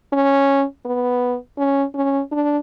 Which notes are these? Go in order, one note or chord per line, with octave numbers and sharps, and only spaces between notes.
C#4
B3
C#4
C#4
D4